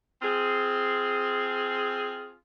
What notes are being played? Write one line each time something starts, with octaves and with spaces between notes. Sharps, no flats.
C4 F4 G#4